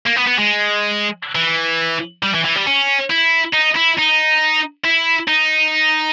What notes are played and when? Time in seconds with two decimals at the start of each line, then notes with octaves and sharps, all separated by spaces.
0.06 A#3
0.16 B3
0.27 B3
0.38 G#3
1.35 E3
2.23 G3
2.34 E3
2.45 E3
2.56 G3
2.66 C#4
3.10 E4
3.53 D#4
3.75 E4
3.98 D#4
4.84 E4
5.28 D#4